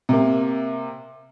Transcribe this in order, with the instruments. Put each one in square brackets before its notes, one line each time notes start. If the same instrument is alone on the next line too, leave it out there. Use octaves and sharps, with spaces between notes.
[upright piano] C3 A#3